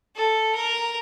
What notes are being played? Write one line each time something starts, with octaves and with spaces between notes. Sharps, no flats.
A4
A#4